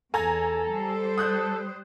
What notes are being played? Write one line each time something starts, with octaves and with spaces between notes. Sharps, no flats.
E2 A4 G#5 A#5 G#6
G3 C5
D#6 F#6 G6